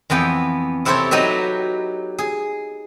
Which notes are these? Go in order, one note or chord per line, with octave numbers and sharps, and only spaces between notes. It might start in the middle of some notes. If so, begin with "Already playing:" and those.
F2 E3 B3 G5
C3 E4 G4 A4 C5 C#5
F#3 D#4 G4 B4 E5
G#4